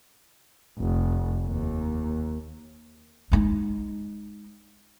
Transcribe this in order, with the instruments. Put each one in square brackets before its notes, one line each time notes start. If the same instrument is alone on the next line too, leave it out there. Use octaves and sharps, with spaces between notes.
[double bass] F1
D#2
[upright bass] G#3 D#4